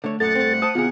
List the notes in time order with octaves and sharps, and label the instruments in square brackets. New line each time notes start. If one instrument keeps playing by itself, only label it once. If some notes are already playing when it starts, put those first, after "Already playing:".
[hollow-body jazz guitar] D3 C#5 [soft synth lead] A3
[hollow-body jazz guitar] F#2 A#2 [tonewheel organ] A4 A6 [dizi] F#5
[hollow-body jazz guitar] G2 C4
[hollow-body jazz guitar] C5 A5 [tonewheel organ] D#6
[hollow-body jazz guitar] D#2 C3 G#4 [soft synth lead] B3 [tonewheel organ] F4